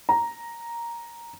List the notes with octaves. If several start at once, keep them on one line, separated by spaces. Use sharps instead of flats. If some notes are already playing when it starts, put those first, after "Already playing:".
A#5